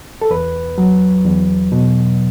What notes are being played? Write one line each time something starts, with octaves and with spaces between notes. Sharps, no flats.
A4
E2 B4
F#3
E2
B2